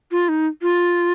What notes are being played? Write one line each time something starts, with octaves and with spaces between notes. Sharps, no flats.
F4
D#4
F4